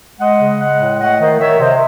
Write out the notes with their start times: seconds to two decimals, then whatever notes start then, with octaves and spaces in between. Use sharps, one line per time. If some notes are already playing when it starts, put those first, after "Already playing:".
0.20 G#3 D#5 F#5
0.40 C#3
0.60 G#3 D#5 F#5
0.81 A2
1.00 A3 D#5 F#5
1.20 D#3 C5 D#5
1.40 D#3 C#5 E5
1.60 C3 C5 D#5